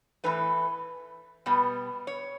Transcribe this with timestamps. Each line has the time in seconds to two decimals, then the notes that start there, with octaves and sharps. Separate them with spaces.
0.24 A2 E3 A3 B4
1.46 B2 G3 B3
2.07 C#5